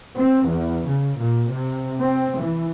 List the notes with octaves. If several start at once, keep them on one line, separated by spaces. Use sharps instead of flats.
C4
E2
C#3
A#2
C3
C4
E3